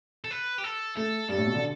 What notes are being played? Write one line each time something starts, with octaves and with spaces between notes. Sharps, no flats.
A4
B4
G4
A4
A3 A4
G2 A4
A2
B2
D3